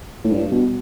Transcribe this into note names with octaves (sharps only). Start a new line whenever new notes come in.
A2
G2
B2